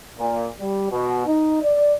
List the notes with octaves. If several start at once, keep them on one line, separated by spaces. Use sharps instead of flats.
A#2
G3
B2
D#4
D5